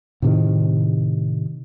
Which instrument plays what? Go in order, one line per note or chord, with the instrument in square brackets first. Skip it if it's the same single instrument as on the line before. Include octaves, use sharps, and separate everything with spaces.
[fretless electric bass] A2 C3 D#3